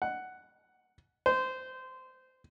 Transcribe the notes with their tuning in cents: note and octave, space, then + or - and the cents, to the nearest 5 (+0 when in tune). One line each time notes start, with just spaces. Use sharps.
F#5 +5
C5 -20